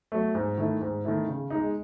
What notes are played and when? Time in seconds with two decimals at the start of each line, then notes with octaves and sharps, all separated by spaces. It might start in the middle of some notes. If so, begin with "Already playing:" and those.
0.12 F#3 A3
0.35 G#2
0.58 D#3 A3 E4
0.81 G#2
1.05 D#3 A3 E4
1.28 C#3
1.50 G#3 D#4